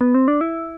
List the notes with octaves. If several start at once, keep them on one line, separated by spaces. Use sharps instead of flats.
B3
C4
D4
E4